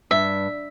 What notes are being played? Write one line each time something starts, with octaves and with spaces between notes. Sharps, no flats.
G2 E5